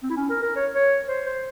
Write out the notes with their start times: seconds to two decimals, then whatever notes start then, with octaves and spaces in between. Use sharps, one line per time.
0.03 C4
0.10 E4
0.17 C#4
0.30 A#4
0.43 A#4
0.56 C#5
0.75 C#5
1.08 C5
1.26 C5